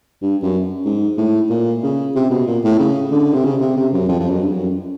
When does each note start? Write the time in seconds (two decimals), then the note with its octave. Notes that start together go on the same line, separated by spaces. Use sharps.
0.22 G2
0.43 F#2
0.85 G#2
1.18 A2
1.50 A#2
1.83 C#3
2.16 C3
2.31 B2
2.47 A#2
2.64 A2
2.80 C#3
3.11 D3
3.34 C3
3.45 C#3
3.61 C3
3.77 C3
3.93 F#2
4.08 F2
4.20 F2
4.30 F#2
4.43 G2
4.52 F#2